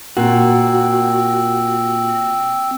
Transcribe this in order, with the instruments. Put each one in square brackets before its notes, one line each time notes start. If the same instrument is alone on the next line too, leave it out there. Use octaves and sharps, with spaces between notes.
[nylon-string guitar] A#2 [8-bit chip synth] C4 G5 E6 [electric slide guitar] F#4